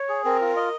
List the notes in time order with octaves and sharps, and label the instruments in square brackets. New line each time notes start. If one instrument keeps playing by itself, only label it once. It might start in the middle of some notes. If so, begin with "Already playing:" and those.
Already playing: [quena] C#5
[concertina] G#4
[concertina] C4 [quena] A#4
[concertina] F4
D#5